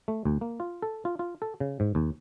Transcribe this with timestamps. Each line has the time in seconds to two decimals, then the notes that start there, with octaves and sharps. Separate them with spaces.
0.08 A3
0.25 D2
0.41 A#3
0.60 F4
0.82 A4
1.05 F4
1.19 F4
1.42 A4
1.60 C#3
1.80 G#2
1.95 D#2